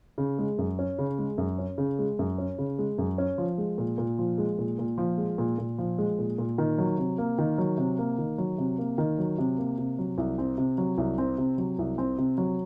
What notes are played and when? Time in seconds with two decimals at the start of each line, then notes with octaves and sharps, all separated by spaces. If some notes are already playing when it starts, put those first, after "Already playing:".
0.18 C#3
0.39 G#3
0.58 F#2
0.79 C#4
0.99 C#3
1.18 G#3
1.38 F#2
1.59 C#4
1.78 C#3
1.99 G#3
2.19 F#2
2.38 C#4
2.58 C#3
2.79 G#3
2.98 F#2
3.18 C#4
3.38 F3
3.58 G#3
3.78 A#2
3.98 A#2
4.19 F3
4.38 G#3
4.58 A#2
4.79 A#2
4.98 F3
5.18 G#3
5.38 A#2
5.58 A#2
5.78 F3
5.98 G#3
6.19 A#2
6.38 A#2
6.58 D#3
6.78 F#3
6.98 C3
7.18 A#3
7.38 D#3
7.58 F#3
7.78 C3
7.98 A#3
8.18 D#3
8.38 F#3
8.58 C3
8.78 A#3
8.98 D#3
9.19 F#3
9.38 C3
9.58 A#3
9.78 C3
9.99 F#3
10.18 C2
10.38 C4
10.58 C3
10.78 F#3
10.98 C2
11.18 C4
11.38 C3
11.58 F#3
11.79 C2
11.98 C4
12.18 C3
12.38 F#3